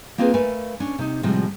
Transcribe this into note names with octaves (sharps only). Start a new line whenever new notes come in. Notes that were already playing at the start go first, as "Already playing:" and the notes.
A#3 C4 F4 G#4 B4
A3 A#4 B4 F5 G#5
C#4 D4
C3 D#4
A2 C3 F3 G3 G#3